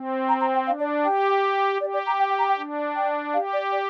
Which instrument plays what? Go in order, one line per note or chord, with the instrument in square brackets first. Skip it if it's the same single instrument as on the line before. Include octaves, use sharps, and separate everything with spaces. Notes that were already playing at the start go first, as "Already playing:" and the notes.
Already playing: [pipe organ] C4
[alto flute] A#5
A#5
G5
[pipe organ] D4 [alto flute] F5
[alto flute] D5
[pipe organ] G4 [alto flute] G5
[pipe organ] G4 [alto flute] D5
[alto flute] D5
A#5
G5
G5
A#5
G5
[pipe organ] D4
[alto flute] G5
[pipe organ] G4 [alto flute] F5
[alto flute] D5
D5